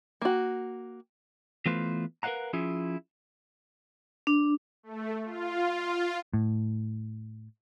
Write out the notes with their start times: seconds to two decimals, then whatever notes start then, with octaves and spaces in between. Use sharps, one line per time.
0.22 A#3 F#4
1.66 E3 A3 B3 F4 B4 C5
2.23 A#4 B4 D#5 F5 F#5 A#5
2.53 F3 C#4 E4 F4 G#4
4.27 D4
4.83 A3
5.25 F4
6.33 A2